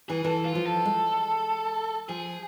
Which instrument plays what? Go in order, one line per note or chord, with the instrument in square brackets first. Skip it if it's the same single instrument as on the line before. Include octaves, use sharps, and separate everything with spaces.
[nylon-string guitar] E3 [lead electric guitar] G#4
[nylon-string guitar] E3 [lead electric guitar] A4
[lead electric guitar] F4
[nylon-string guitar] F3
[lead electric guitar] A4
[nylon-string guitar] G#3
[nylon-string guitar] F3 [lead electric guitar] G#4